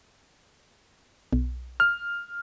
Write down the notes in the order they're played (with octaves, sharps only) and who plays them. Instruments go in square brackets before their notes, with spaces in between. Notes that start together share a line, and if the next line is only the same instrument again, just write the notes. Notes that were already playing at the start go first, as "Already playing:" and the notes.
[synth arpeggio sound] B1
[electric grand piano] F6